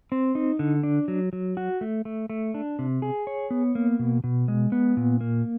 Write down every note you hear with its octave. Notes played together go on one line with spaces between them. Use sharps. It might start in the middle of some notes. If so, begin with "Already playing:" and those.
C4
D#4
D3
D4
F#3
F#3
F#4
A3
A3
A3
D4
C3
G#4
C#5
B3
A#3
B2
B2
G#3
B3
A#2
A#3